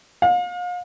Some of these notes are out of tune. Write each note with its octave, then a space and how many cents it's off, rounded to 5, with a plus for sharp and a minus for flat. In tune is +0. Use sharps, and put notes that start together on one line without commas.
F5 +40